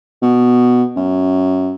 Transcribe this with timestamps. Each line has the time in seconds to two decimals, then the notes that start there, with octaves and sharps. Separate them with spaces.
0.22 B2
0.96 F#2